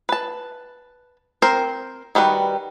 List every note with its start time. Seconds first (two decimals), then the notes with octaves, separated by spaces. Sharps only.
0.09 B4 A5
1.42 C4 A#4 C5
2.15 D#3 G3 F#4 B4